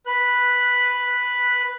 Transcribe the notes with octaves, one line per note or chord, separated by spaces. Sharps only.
B4 F#6